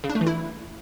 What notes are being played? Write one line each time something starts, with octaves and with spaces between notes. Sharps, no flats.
C#3
D4
A3
E3
E4